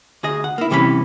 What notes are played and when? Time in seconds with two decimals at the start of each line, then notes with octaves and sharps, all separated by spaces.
0.23 D2 G#4 D#5
0.44 F#5
0.58 A#3 E4
0.70 C2 C3 E3 C#4 G#4 B5